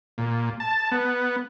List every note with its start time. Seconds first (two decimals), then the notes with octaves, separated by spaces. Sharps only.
0.18 A#2
0.60 A5
0.92 B3